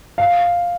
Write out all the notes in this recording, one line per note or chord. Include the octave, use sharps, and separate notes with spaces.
F5